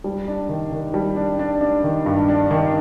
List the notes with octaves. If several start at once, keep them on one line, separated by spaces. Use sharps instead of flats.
G3
D4
D#3
D#3
G3
D4
D4
D4
D#3
G2
D4
D#3